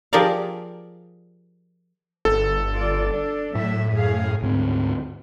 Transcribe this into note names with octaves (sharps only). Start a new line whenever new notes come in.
F3 G4 G#4 A#4 D5 F5
G1 A4
F4 D5
D4
A2 F#3 E5
F#2 G#4 F5
D2 G#2 C4